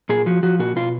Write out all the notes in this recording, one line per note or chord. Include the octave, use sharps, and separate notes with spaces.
A#2 G#4
F3 F#4
F3 F#4
A#2 F#4
B2 F4